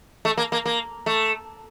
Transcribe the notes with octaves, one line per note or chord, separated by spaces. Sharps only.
A3
A#3
A#3
A#3
A3